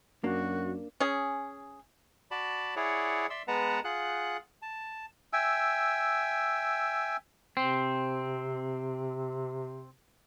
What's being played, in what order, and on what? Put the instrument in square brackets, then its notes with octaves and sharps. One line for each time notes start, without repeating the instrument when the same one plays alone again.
[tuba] F#2 [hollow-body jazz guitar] A#3 D4 [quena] F#4
[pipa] C#4 G#4
[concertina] F#4 D5 A5 B5
E4 G#4 C#5 D5 F#5
D5 E5 C6 E6
G#3 B3 B4 F#5 A5 A#5
F4 G#4 F#5 F#6
A5
[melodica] E5 G5 G#5 E6
[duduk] C3 [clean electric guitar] C4